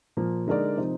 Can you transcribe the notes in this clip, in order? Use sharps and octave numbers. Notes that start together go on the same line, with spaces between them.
A#2 F3 A#3
D3 G#3 D#4 A#4 D5
C3 F3 C4 D#4